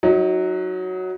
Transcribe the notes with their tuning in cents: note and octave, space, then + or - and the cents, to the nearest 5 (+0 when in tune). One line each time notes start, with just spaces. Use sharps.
F#3 +0 D#4 +30